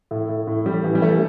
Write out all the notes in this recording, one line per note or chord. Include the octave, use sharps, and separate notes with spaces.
A2
A2
A2
A2 G3
E3
G3
E3 A3
A3